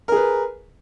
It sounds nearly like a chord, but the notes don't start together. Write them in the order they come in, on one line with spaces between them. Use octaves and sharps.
A#4 G#4 B4